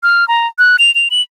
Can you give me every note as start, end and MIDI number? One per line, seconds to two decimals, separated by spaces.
0.03 0.27 89
0.28 0.47 82
0.59 0.77 90
0.79 0.93 101
0.95 1.08 101
1.11 1.22 102